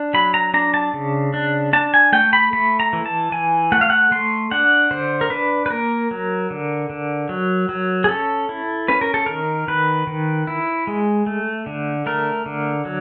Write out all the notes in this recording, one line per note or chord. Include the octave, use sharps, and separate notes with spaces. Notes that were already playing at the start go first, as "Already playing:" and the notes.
Already playing: D4
F#3 B5
A#5
D4 A#5
A5
C#3
D4
D4 A5
G#5
A3 G5
B5
A3 B5
A#5
E3
A5
E3 G#5
A3 F#5
F5
F#5
A3 C6
D4 F#5
D3 C5
A#4
D4 B4
B4
A#3 A#4
F#3
D3
D3
F#3
F#3
G#4
C#4 A4
E4
C#4 B4
A#4
A4
D#3 A#4
D#3 B4
D#3
E4
G#3
A3
D3
A3 A#4
D3
F#3